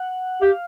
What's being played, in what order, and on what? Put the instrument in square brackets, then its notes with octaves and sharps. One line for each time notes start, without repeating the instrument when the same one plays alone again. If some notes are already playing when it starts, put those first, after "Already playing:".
Already playing: [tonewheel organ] F#5
[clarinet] G4 [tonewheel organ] F5